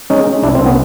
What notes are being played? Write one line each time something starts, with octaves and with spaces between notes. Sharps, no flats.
G#3 C#4 D#4
G#3
C2 D4 E4
C4
C2
B3 C#4